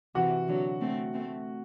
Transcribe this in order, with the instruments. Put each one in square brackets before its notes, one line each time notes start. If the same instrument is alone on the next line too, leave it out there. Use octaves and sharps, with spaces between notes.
[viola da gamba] C3 E3 [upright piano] F#4
[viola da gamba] D3 F#3
A3 C4
A3 C4